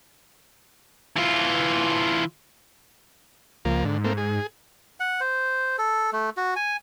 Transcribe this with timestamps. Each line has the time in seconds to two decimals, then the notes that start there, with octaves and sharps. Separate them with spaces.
1.16 E3 F4
3.65 C#2 F3 A#3
3.85 G#2 D3
4.04 A3 A#3 C4
4.17 G#4
5.00 F#5
5.20 C5
5.79 A4
6.13 A3
6.37 F#4
6.56 G#5